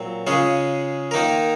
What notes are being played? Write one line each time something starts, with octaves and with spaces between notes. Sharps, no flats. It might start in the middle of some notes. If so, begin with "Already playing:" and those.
Already playing: A#2 F#3 C4
C#3 G#3 C#4 F4 G#4
D#3 A#3 D#4 A#4